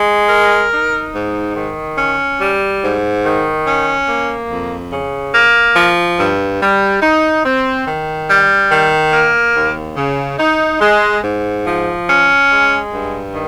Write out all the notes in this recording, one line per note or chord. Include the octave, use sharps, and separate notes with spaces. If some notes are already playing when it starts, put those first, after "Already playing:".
Already playing: G#3
A#4
D#4
G#2
D#3
C#4
G3
G#2
D#3
C#4
A#3
F2
C#3
A#3
F3
G2
G3
D#4
C4
D#3
G3
D#3
A#3
D#2
C#3
D#4
G#3
G#2
F3
C#4
G#3
G2
D#3